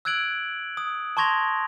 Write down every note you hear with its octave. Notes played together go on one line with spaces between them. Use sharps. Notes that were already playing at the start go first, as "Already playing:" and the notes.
E6 F#6 G#6 D7 F#7
D#6
A5 C6 C#6 G#6 A#6 F7